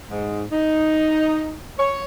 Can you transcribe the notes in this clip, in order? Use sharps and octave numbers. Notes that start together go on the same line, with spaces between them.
G#2
D#4
C#5